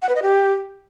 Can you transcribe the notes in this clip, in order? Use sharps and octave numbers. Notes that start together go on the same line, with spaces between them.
F#5
B4
D#5
G4